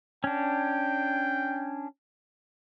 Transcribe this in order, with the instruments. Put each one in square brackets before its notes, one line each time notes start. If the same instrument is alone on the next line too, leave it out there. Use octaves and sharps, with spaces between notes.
[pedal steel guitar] C#4 D4 [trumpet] G5